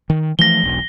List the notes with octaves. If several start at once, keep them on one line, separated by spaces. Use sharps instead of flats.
D#3
E3 F3 A3 A#6 G7
E1 B1